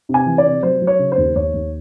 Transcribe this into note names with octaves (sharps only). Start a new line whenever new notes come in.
C3
G#5
E3
D5
C3
F#3 C5
F#3
C#5
C#3
C5
D#2
D#2 C#5
D#2